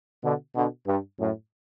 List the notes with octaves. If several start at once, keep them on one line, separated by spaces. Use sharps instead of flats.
B2 D3
B2 D3
G2
F#2 A2